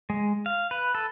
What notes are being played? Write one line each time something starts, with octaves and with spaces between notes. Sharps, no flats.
G#3
F5
B4
A4